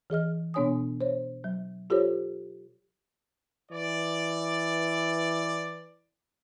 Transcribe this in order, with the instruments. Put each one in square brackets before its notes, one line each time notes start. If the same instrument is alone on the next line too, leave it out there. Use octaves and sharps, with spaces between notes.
[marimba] E3 G#4 D#5 F6
B2 B3 D4 C#5 G#5 D#6
C5 C#5
F#3
F4 G4 A4 C5 C#5
[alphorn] E3 [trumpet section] D5